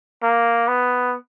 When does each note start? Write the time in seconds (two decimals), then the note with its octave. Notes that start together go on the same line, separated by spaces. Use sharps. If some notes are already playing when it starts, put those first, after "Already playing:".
0.23 A#3
0.68 B3